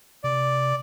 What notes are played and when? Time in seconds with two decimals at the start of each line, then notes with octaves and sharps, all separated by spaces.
0.24 C3 D5